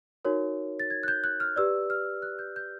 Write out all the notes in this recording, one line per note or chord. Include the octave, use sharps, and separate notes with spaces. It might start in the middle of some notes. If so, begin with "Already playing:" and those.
D#4 F#4 A#4 C#5
A6
G#6
F#6
G6
F#6
F6
G4 B4 D5 E6
F6
F#6
G6
G6